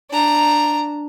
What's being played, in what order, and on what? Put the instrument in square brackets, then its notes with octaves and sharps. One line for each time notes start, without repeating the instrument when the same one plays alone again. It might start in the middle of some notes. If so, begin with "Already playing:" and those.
[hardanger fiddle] D4 A#5